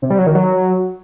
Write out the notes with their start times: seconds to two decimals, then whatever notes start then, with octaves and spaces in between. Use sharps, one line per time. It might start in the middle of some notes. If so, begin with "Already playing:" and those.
0.02 C3
0.10 G3
0.18 F#3
0.27 D#3
0.35 F#3